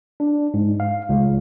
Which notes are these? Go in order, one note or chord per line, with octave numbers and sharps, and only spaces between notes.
D4
G#2
F5
C#2